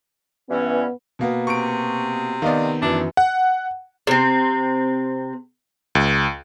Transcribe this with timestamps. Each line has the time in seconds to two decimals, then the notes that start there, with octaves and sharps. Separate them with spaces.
0.50 G2 E3 B3 C#4
1.19 B2 A#3 B3
1.47 C3 C#6 D7
2.42 D#3 B3 D5 D#5 F5
2.82 F#2 E3 D4
3.17 F#5
4.07 C3 C4
5.95 C#2